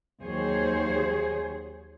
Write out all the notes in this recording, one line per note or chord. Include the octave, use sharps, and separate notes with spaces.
D#2 F#3 G#4 C5 C#5